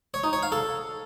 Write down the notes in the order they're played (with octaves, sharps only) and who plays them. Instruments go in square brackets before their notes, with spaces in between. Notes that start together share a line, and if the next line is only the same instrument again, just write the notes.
[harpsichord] C#5
D#4
C#5
F5
A4